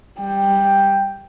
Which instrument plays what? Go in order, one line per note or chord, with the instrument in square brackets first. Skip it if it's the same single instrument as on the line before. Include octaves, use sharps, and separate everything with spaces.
[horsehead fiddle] G3 [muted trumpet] G5